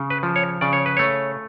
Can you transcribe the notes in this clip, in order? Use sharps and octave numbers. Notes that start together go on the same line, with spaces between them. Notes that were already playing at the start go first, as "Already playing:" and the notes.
Already playing: C#3
B4
F3
C#5
C#3 D5
C#5
B4
A3 C#5